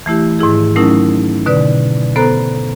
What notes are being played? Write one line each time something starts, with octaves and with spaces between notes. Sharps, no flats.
E3 A3 E4 G4
G#2 D#3 E4 G#4
F#3 A3 C#4 D#4 E4 A#4
B2 D3 B4 D5
B3 A4 C5 A#5 F#6